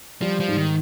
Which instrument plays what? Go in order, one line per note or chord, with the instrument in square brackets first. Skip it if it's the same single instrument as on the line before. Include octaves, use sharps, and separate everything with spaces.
[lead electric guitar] F3 [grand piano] G3
[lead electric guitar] F3
[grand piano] G#2
[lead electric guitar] D#3